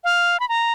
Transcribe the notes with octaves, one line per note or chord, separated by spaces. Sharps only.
F5
B5
A#5